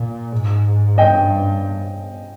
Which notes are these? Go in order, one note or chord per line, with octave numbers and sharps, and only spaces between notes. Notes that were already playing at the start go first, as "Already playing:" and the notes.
Already playing: A#2
G#2
G2 D#5 G5